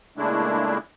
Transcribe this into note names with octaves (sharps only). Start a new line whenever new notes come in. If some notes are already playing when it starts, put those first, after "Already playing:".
A#2 C#3 G#3 A3 D4 E4